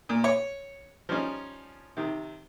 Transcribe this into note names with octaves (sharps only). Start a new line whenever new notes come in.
A#2
C#5
F3 G3 C#4 D#4
C3 D#3